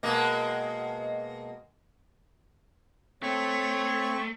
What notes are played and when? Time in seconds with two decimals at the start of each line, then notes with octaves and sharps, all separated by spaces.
0.03 B2 G#3 A#3
3.23 A3 C4 C#5 C#6